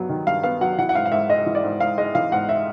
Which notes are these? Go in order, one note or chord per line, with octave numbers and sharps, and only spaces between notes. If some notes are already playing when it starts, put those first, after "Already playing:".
Already playing: G2 F#3 B3
D#3
G2 F5
B3 F5
F#3 F#5
E3 F#5
F#5
G#2 F5
F5
G#2 E5
G#3 D#5
E3
D5
G#2
G#2 F5
G#3 D#5
E3 F5
G#2 F#5
E5